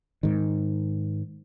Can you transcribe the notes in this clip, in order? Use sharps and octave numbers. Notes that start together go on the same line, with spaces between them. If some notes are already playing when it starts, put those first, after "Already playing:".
G#2 D#3